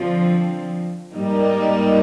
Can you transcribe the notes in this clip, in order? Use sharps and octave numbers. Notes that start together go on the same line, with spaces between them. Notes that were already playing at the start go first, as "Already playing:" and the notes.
Already playing: D3 F3 C4
G#2 G3 A#3 D#4